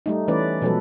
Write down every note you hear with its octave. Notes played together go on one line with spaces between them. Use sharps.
G3 A3 D#4
E3 A3 C#4 B4 D5
B2 F3 F#3 G#3 A4 B4